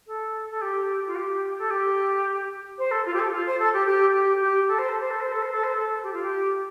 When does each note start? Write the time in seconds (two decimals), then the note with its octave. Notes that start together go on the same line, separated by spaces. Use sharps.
0.07 A4
0.50 A4
0.61 G4
1.07 F4
1.15 G4
1.58 A4
1.70 G4
2.78 C5
2.91 A4
3.05 F4
3.14 G4
3.19 A4
3.32 F4
3.46 C5
3.59 A4
3.73 G4
3.87 G4
4.14 G4
4.41 G4
4.68 A4
4.78 C5
4.89 A4
5.00 C5
5.10 A4
5.20 C5
5.32 A4
5.42 C5
5.52 A4
5.63 C5
5.74 A4
6.03 G4
6.13 F4
6.22 G4